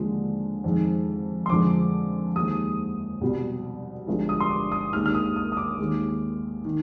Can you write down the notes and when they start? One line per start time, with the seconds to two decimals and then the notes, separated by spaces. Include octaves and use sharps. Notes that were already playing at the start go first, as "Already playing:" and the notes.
Already playing: D#2 D3 F3 G#3
0.64 F2 D#3 G#3
1.46 C6
1.50 F2 D3 F3 G#3 D6
2.36 D#2 D#3 G#3 D#6
3.21 C2 B2 G3
4.07 G1 G2 F3 G#3
4.29 D#6
4.40 C6
4.51 D6
4.72 D#6
4.93 D#2 D#3 G#3 F6
5.06 F6
5.15 D#6
5.36 D#6
5.52 D#6
5.57 D6
5.78 D#2 D#3 G#3
6.65 D#3